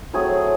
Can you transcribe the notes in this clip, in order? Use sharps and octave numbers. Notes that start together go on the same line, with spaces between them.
A2 F#3 A3 C4 G#4